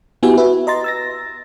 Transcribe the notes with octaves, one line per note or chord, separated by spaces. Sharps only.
B3 E4 F#4 G4 E5 G#5
F#4 B4 E5
D#5 A#5 C6 A6
E6 A6 A#6